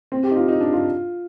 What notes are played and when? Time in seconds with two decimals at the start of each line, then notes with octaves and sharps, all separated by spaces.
0.12 C4
0.23 G4
0.31 D#4
0.36 F4
0.48 D#4
0.60 D4
0.72 F4